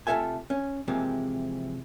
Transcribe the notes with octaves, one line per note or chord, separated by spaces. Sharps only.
C3 A3 F4 A4 E5 G#5
C#4
C3 E3 F3 G#3 A#3 C4